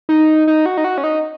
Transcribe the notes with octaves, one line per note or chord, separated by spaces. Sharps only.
D#4
D#4
F#4
D#4
F#4
C#4
D#4